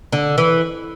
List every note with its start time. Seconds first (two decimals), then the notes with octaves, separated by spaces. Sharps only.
0.12 D3
0.38 E3